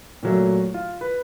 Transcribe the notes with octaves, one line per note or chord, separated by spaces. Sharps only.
A#2 F#3 A3
F4
B4